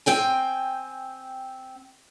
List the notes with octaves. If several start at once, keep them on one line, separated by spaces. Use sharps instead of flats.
C4 G5 G#5